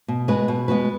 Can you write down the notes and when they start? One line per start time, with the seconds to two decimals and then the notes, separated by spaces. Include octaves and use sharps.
0.08 B2
0.28 G#3 B3 F#4 B4
0.48 B2
0.68 G#3 B3 F#4 B4